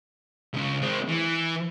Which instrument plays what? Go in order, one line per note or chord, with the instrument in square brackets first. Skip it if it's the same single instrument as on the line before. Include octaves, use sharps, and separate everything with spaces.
[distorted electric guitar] C#2 C#3
G#3 C4
E3